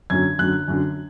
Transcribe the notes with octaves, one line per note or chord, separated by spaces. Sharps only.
F#2 D3 F#3 G#6
F#2 D3 F#3 F#6
F#2 D3 F#3